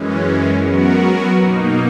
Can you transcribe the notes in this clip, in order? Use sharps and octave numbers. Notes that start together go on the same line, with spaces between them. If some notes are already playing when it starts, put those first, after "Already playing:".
Already playing: F#2 E3 G#3 C#4
F#3 B3 F#4 A#4
B2 A#3 D#4